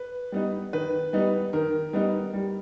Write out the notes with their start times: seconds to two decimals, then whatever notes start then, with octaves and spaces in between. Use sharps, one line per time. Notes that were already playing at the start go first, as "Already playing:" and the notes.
Already playing: B4
0.32 G3 B3 D#4
0.73 D#3 B4
1.13 G3 B3 D#4
1.53 D#3 A#4
1.93 G3 B3 D#4
2.34 G3